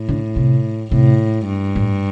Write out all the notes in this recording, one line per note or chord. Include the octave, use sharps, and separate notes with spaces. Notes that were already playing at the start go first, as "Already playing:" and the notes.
Already playing: A2
D3
C3
A2 C3
G2
A2